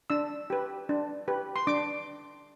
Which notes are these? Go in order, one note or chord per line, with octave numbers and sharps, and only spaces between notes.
D4 E6
G4 B4
D4
G4 B4
C6
D4 D6